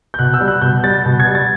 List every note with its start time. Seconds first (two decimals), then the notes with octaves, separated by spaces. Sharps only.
0.14 G6
0.19 B2 F#6
0.34 E6
0.41 G3
0.47 F#6
0.61 B2 G6
0.84 G3 A6
1.06 B2
1.20 G#6
1.27 G3
1.35 A6